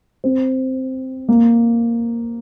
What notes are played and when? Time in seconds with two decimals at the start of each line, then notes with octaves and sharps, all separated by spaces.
0.24 C4
1.29 A#3